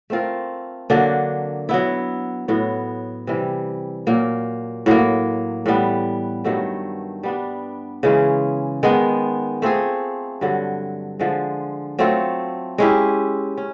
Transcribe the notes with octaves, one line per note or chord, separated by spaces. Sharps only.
A3 C4 F4 A#4
D3 F#3 A#3 D4
F#3 B3 E4
A2 F#3 B3
C3 E3 G3
A#2 F#3 A#3
A2 F#3 A#3
A2 E3 G3 B3
G2 D#3 F#3 A3
G3 B3 D4
C#3 E3 G#3 C#4
D#3 G#3 B3
A3 C4 F4 G#4
G2 D3 F#3
D3 F3 G#3
F#3 A3 C4 F4
G#3 C#4 E4 G4
C#4